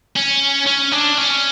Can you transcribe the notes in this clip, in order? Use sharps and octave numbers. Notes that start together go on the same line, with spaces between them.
C#4
C#4
D4
C#4